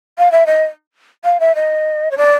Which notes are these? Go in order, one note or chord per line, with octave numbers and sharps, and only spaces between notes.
F5
E5
D#5
F5
E5
D#5
C#5
D5